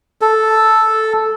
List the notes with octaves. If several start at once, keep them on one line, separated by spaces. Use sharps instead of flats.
A4